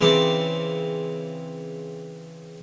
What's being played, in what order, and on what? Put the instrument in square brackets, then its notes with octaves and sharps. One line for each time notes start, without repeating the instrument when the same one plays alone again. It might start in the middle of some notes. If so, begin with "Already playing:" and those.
[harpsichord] C#3 E3 C4 D6